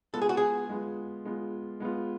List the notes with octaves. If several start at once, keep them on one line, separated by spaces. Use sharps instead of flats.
G#3 B3 F4 A4
G#4
F#4
G#4
G#3 B3 F4
G#3 B3 F4
G#3 B3 F4